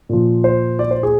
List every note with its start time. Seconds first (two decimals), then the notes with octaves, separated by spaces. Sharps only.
0.09 A#2 F3
0.44 C5
0.79 D5
0.91 C5
1.03 G#4